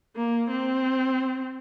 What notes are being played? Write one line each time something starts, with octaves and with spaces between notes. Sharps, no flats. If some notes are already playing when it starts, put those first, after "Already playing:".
A#3
C4